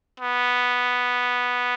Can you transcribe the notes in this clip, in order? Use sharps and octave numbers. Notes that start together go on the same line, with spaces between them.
B3